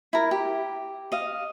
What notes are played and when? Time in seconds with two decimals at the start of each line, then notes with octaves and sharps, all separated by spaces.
0.13 E4 A#4
0.31 G4
1.12 D#5 F5